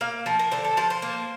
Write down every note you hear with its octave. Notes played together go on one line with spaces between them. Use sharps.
A#3 F5
F3 A#4
A#4
D3 C5
A4
F3 C5
C5
A#3